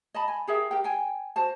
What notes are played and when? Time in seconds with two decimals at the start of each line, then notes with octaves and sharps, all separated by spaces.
0.14 D#5 A5 B5
0.28 G#5
0.47 G4 G#4 A#4 E5
0.71 G4 A#4 G5
0.84 G5 G#5
1.36 F#4 C5 A5